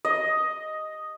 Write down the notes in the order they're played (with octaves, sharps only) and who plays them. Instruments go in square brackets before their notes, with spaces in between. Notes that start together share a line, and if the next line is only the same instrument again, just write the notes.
[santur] D#5